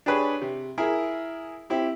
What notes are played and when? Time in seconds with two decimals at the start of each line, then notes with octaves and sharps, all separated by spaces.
0.06 D4 G4 G#4 B4 C#5
0.42 C3
0.78 E4 G#4 A#4
1.70 C4 E4 G4